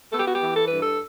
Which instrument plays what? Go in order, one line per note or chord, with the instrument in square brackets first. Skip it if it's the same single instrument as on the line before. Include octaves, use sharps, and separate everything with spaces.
[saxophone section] B3 A4
G4
F#4
G4
E3
A4
G2 B4
A4